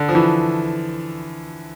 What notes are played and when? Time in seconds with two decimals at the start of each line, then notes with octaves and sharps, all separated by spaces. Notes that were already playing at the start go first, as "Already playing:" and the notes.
Already playing: D3
0.09 F3
0.15 E3